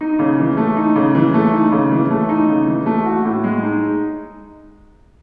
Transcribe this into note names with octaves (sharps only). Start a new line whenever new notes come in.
D#4
C#3
E3
A3
D#4
C#3
E3
A3
D#4
C#3
E3
A3
D#4
C#3
E3
A3
F#4
A2
G#3
D#4